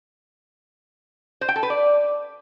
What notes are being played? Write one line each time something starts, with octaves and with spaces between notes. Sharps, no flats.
C5
G5
A4
B4
D5